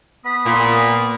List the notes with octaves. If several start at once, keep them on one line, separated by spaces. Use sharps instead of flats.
B3 B5 D#6
A#2